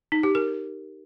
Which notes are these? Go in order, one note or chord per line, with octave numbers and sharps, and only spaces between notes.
D#4
G4
A#4